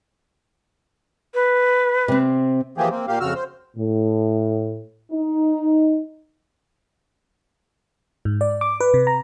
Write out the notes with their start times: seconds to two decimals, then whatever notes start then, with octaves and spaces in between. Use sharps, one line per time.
1.34 B4
2.08 C3 C4
2.78 E3 F3 A#3 G4 G#4
2.90 A#3 C4
3.08 A#2 A#3 G4 F5
3.20 F2 C#3 F#4 E6 F6
3.35 C5
3.77 A2
5.11 D#4
8.25 G#2
8.41 D5
8.61 D6
8.80 B4
8.94 C3
9.07 A#5